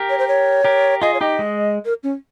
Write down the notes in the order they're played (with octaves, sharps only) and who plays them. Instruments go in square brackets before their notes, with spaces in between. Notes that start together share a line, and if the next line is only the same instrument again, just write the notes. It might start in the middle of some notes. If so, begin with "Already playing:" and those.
Already playing: [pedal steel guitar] G4 A#4
[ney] C#5
C5
C#5
[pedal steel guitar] G4 A#4
[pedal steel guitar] F4 G#4 [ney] D#5
[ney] C#5
[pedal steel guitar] D#4 G4 [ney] D#5
[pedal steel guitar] G#3
[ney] A#4
C#4